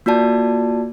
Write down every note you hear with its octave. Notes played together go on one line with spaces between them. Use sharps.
A#3 F4 F#4 D5 A5